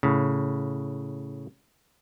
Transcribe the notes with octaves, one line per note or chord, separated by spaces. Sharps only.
A2 C#3